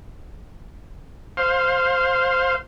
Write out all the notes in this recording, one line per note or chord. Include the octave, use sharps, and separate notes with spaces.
C5 F5